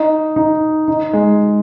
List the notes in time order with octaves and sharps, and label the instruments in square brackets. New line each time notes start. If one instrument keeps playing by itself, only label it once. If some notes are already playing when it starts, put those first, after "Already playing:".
Already playing: [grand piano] D#4
D#4
D#4
G#3